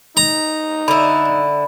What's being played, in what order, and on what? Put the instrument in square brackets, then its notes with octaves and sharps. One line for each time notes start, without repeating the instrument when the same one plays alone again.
[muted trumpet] D#4 [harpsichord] A#5
[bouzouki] D3 E4 [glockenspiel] B5